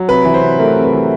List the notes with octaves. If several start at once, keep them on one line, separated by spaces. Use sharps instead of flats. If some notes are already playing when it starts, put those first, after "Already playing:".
Already playing: F#3
C3 B4
E3
C5
C3
A3 A#4
C3
B4
E3